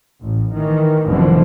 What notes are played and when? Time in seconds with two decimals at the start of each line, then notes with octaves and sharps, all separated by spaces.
0.22 A1
0.55 D#3 E3
1.08 F1 F#2 B2 D3 E3 F3